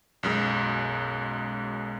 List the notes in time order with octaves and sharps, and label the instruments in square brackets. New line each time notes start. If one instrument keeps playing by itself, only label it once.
[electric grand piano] B1 F#2 G#3